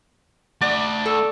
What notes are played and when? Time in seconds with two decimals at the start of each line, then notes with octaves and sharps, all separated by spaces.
0.61 A3 D5 F#5
1.05 A4